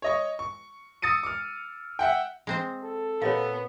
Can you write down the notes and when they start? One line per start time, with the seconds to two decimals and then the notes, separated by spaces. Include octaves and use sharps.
0.02 C#5 D#5 C#6
0.39 C#6
1.02 D#6 E6 A6 C#7 D#7
1.23 D6 F6
1.99 E5 F#5 G5
2.47 G#3 C4 C5
2.83 A4
3.22 A#2 B3 C#5 D#5 F5